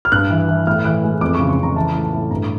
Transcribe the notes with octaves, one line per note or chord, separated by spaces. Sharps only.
F6
G2 F#6
E3
E3
A2 F6
E3 F#6
G#3
F2 D6
C#6
C#3
C6
C#3 A#5
E3 A5
A2
A5
A2
G2 A#5